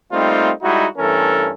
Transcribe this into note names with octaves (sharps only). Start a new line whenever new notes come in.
G3 A3 A#3 C4 D#4 F4
G3 G#3 D#4 E4 F#4
G2 E3 A3 C#4 A4 A#4